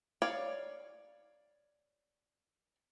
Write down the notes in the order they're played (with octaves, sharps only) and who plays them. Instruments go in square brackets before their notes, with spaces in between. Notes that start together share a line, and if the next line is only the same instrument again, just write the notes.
[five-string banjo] C#5 D5 F5